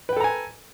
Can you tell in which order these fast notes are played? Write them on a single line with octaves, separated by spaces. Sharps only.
B4 G5 A4 A#5 G#5